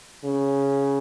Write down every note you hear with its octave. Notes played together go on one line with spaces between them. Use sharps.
C#3